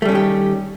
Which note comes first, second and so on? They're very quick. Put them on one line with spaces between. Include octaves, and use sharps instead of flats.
A3 G3 C#4 D#3 G4